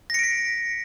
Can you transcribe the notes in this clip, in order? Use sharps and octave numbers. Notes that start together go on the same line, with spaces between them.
A#6 B6 C#7 D7